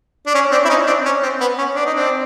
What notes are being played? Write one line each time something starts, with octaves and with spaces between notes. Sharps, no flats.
D4
C#4
C4 D4
E4
C#4 D#4
C4 D4
C#4
C4
B3
C#4
D4
D#4
C4 D4